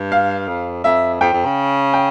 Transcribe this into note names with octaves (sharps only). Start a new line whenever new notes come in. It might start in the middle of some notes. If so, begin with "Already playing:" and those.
Already playing: G2
F5
F2
F2 E5
F2 G5
F2
C#3
G5